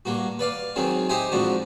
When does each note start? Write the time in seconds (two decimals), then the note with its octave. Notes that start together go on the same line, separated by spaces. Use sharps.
0.05 G2 A#3 F#4
0.39 B4 D5 F5
0.76 D#3 F#3 G#3 C4
1.09 D#4 G4 C5 E5 G5 G#5
1.32 F2 G#2 F3 D4 F#4